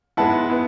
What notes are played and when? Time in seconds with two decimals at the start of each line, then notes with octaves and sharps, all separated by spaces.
0.17 G#2 G#3 B3 E4 F#5 A5
0.50 B3 E4